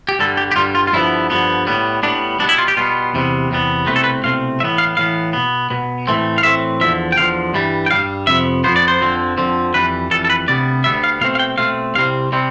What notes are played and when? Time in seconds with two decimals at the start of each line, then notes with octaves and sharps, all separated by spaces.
0.09 G4
0.19 G2 D3 G3 A4
0.37 G4
0.52 G4
0.56 G2 D3 G3 F4
0.75 F4
0.87 F4
0.93 G2 D3 F3 B3 E4
1.30 G2 D3 F3 B3
1.67 A2 G3 B3
2.03 A2 G3 B3 D4
2.39 B2 G3 B3 D4
2.49 E4
2.58 F4
2.68 G4
2.77 B2 G3 B3 F4
3.13 E2 C3 G3 B3
3.50 E2 C3 G3 B3
3.86 C2 B2 A3 C4 B4
3.96 A4
4.04 B4
4.23 C2 B2 A3 C4 F5
4.60 A2 E3 B3 E5
4.78 F5
4.97 A2 E3 B3 F5
5.33 B2 B3
5.70 B2 B3
6.07 A2 E3 A3 C4
6.38 F5
6.43 A2 E3 A3 C4 E5
6.81 E2 D3 F3 E5
7.12 G5
7.17 E2 D3 F3 F5
7.54 G2 E3 G3
7.86 G5
7.91 G2 E3 G3 F5
8.27 F2 C3 F3 B3 E5
8.64 F2 C3 F3 B3 C5
8.76 D5
8.88 C5
9.01 F2 D3 F3 C4
9.37 F2 D3 F3 C4
9.74 F2 E3 G3 B4
10.11 F2 E3 G3 A4
10.25 A4
10.30 B4
10.47 D2 C3 G3 B3 D5
10.84 D2 C3 G3 B3 E5
11.04 F5
11.21 B2 A3 C4 F5
11.35 F5
11.39 G5
11.58 B2 A3 C4 F5
11.95 C2 C3 G3 C4 F5
12.32 C3 G3 C4